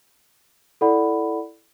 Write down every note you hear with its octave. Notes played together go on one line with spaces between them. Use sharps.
E4 A4 D5 F#5 B5